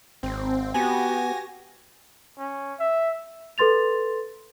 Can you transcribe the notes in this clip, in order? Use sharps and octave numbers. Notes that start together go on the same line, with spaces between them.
G#1 C4
B3 F#4 G4 G#5 A#6
C#4
E5
A4 B4 C6 A6 F7